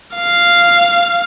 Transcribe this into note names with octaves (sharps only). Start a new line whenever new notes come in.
F5